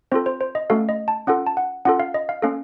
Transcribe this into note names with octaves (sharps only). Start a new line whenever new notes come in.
C4 F4 A4 C5
C5
C5
D#5
A3 C#4 F#4 A4 F5
D#5
A5
C#4 F4 A4 F#5
A5
F#5
C#4 F4 A4 F#5
F5
D#5
F5
A#3 C#4 A4 F5